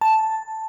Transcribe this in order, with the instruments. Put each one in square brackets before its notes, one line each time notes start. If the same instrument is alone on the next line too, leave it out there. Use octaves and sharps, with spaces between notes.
[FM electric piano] A5